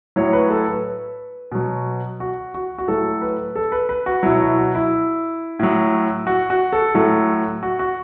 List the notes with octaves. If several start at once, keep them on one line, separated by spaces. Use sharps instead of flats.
A2 F#3 C#5
B4
A4
B4
B2 F#3
F#4
F#4
F#4
A2 F#3 A4
B4
A4
B4
B4
F#4
B2 F#3 E4
E4
F#4
E4
A2 F#3
F#4
F#4
A4
A2 F#3 A4
F#4
F#4